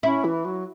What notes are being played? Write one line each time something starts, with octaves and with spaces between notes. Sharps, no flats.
C#4 E4
E3
F#3